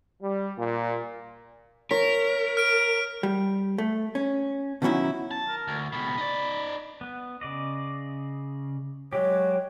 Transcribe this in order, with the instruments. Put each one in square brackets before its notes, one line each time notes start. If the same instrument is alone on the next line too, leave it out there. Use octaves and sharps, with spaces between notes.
[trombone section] G3
A#2
[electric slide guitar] A#4 [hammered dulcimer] C#5 [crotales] B6
[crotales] F6 D7
[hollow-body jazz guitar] G3
A3
C#4
B2 D#3 F#3 C#4 E4 F#4
[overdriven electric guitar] A5
[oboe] A#4
[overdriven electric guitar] D2
[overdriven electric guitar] C#2 B2 [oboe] B5
[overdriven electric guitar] D#4 D5
[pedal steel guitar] B3
C#3 D5 D#5
[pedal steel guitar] F#3 G#3 G4 [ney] C#5